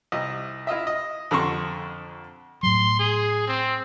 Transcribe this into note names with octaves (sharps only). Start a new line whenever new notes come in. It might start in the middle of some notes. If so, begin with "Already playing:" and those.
C2 D#5
E4 F4 D#5 E5
D#5
F2 D3 A#5 C6 C#6
A2 F#3 C6
G#4
C4